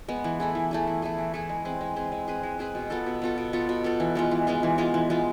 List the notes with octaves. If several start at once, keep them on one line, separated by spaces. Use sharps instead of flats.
G#3 B3
E3
A3 E4 G#4
E3
A3 E4 G#4
E3
A3 E4 G#4
E3
A3 E4 G#4
G#3
C4 G#4 B4
G#3
C4 G#4 B4
G#3
C4 G#4 B4
G#3
C4 G#4 B4
B2
B3 F4 A4
B2
B3 F4 A4
B2
B3 F4 A4
B2
B3 F4 A4
E3
G#3 B3 F4
E3
G#3 B3 F4
E3
G#3 B3 F4
E3
G#3 B3 F4